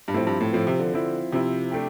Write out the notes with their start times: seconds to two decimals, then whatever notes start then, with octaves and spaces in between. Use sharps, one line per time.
0.08 G2
0.14 A2 F3 C4 E4
0.27 G2
0.41 A2
0.53 A2 F3 C4 E4
0.67 C3
0.79 D3
0.93 F3 C4 E4
1.32 C3 F3 C4 E4
1.72 A3 D4 G4